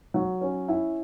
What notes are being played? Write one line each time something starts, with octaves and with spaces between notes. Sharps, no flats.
F#3
C#4
E4